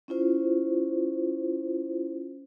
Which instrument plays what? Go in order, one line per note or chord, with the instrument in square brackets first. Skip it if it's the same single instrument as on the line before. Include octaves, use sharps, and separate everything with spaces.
[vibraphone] C#4 E4 F4 C5